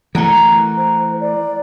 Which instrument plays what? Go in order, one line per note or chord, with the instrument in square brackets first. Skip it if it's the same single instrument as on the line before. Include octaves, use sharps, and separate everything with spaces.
[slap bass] E3 A3 [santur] A#4 F#5 A#5
[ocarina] C5
D5